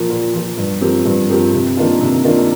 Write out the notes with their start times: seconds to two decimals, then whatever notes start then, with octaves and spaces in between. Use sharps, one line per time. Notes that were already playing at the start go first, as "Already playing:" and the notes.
Already playing: A#2 F3 A#3
0.10 A#2
0.34 F3 A#3
0.58 G2
0.81 F3 C4 G4 A#4
1.06 G2
1.29 F3 C4 G4 A#4
1.53 C3
1.77 D#3 A#3 D4 F4
2.01 C3
2.24 D#3 A#3 D4 F4